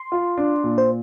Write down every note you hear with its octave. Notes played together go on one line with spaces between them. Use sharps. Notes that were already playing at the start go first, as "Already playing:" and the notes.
Already playing: C6
F4
D4
A#2
C5